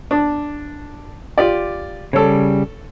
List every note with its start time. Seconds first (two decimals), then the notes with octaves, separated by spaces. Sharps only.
0.11 D4
1.38 F4 G4 D5
2.13 C#3 G3 A4 C#5